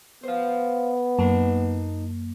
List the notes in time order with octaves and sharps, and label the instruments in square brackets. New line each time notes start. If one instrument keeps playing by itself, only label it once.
[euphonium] B3 [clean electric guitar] C5 F5
[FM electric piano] F#2 A#3 [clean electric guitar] D#4 A5